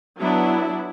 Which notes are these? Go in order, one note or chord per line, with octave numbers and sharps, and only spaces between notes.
F#3 B3 D4 E4